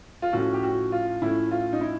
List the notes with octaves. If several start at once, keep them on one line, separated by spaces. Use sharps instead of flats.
F4
A2 F3 A3 C#4 F#4
G4
F#4
F4
A2 F3 A3 C#4 E4
F4
D#4
E4